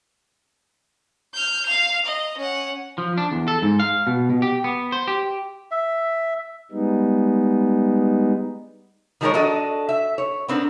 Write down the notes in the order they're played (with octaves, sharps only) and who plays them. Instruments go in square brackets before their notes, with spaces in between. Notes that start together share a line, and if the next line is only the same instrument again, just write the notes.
[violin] F6 G6
F5 F7
D#5
C#4 F#5
[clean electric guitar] F3
D4
E2
A4
G#2
F5
B2
B2
G4
B3
C5
G4
[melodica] E5
[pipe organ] G3 G#3 B3 D#4
[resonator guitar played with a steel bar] D#3 F3 G#3 G#4 A#4 C#5
D4 F#4 A4 D#5
E5
C#5
B3 C4 D4 A#4